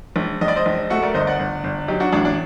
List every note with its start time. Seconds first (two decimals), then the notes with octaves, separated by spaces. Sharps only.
0.16 A#1
0.41 A#1 D#5
0.48 D5
0.56 C5 D#5
0.66 A#1
0.90 A3 F#4 A4
1.02 A#4 D5
1.14 G1 C5 D#5
1.27 D5 F#5
1.39 G1
1.64 G1
1.88 F#3 D#4 G4
2.00 D4 F#4
2.12 A1 D4 F#4
2.25 D4